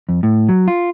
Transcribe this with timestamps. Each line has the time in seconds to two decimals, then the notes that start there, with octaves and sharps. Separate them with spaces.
0.09 F2
0.23 A2
0.49 F#3
0.68 F4